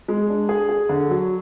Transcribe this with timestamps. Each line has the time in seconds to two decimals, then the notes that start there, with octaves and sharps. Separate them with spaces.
0.08 G#3
0.29 D4
0.49 G#4
0.69 G#4
0.89 D3
1.10 F#3